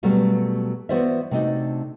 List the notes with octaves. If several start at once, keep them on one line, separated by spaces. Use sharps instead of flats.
B2 F#3 G3 A3 A#3
E3 B3 F#4 C5 D5 E5
C3 A3 D4 D#4 F#4